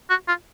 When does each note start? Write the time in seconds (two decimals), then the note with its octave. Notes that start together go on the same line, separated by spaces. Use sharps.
0.10 F#4
0.28 F4